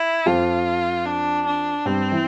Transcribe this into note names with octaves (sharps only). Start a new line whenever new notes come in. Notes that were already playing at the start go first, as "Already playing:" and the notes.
Already playing: E4
F2 F3 F4
D4
D4
G2 G3 C4
E3